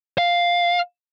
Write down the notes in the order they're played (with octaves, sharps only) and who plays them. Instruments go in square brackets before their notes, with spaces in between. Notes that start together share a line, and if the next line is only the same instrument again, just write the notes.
[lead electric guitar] F5